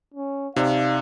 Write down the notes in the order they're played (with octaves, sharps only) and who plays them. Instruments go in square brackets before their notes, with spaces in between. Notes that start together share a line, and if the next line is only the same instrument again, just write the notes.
[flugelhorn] C#4
[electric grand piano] C3 [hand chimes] D#4 D5 [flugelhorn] F5